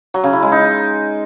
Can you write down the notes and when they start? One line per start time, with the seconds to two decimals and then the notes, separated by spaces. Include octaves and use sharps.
0.14 F#3
0.24 C#3
0.33 E4
0.42 G#3
0.52 D#4